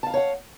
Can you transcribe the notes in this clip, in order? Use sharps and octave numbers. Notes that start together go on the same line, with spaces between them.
C#5 F5 F#5 A5 A#5